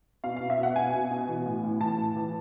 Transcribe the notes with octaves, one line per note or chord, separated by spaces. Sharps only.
B2 F5
B2 F5
E5
B2 F#5
B2 G#5
B2
B2
E3
A2
A2
E3 A5
A2
E3